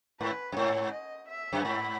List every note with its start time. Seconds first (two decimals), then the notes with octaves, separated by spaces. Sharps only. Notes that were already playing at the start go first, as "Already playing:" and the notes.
0.20 G#2 B4
0.52 F#2
0.57 G#2 C#5
0.93 D#5
1.29 E5
1.53 F#2
1.65 G#2 B5